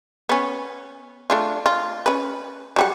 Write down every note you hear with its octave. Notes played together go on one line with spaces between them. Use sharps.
B3 C#4
A3 D4 F4
F4
C#4 B4
F#3 G3 F#5